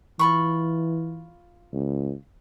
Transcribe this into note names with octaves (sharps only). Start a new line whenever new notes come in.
E3 F4 B5 C#6
C#2